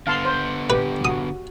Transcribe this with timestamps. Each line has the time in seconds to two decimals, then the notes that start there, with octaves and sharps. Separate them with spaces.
0.07 D3 B3 F5 A5 C6
0.25 C5
0.70 G4 B4
1.05 F#4 D#6